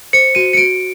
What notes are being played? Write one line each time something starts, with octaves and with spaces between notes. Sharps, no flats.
C5 C#7
F#4 D#7
C#7
F#4 D7